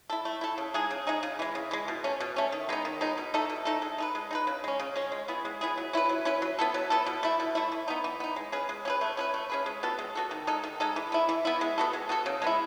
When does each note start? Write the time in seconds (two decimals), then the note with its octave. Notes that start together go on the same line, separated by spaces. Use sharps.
0.10 E4 A4
0.25 A3
0.41 E4 A4
0.58 C#3
0.74 G#3 D#4 G#4
0.90 C#3
1.07 G#3 D#4 G#4
1.23 C#3
1.39 E3 G#3
1.55 C#3
1.71 E3 G#3
1.88 B2
2.04 A3 C#4
2.20 B2
2.36 A3 C#4
2.52 D#3
2.69 G#3 B3 D#4
2.85 D#3
3.01 G#3 B3 D#4
3.18 B2
3.34 A3 D#4 A4
3.50 B2
3.65 A3 D#4 A4
3.82 G#3
3.98 D#4 G#4 B4
4.15 G#3
4.31 D#4 G#4 B4
4.47 C#3
4.64 G#3 C#4
4.80 C#3
4.96 G#3 C#4
5.12 G#3
5.28 B3 E4 G#4
5.45 G#3
5.61 B3 E4 G#4
5.77 F#3
5.93 C#4 E4 B4
6.09 F#3
6.25 C#4 E4 B4
6.42 F#3
6.59 B3 E4 A4
6.74 F#3
6.90 B3 E4 A4
7.06 B2
7.23 A3 E4
7.40 B2
7.55 A3 E4
7.72 E3
7.88 B3 D#4
8.04 E3
8.20 B3 D#4
8.36 G#3
8.52 C#4 G#4 B4
8.69 G#3
8.85 C#4 G#4 B4
9.01 A3
9.17 C#4 G#4 B4
9.34 A3
9.50 C#4 G#4 B4
9.66 G#3
9.83 B3 F#4 A4
9.99 G#3
10.15 B3 F#4 A4
10.31 D#3
10.47 G#3 D#4 A4
10.64 D#3
10.80 G#3 D#4 A4
10.96 E3
11.12 B3 E4
11.29 E3
11.45 B3 E4
11.61 G#3
11.78 B3 F#4 A4
11.93 G#3
12.09 B3 F#4 A4
12.26 C#3
12.42 G#3 B3 E4